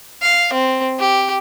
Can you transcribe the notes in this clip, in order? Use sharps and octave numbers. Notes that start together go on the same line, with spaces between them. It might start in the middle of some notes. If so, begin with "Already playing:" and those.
F5
C4
G4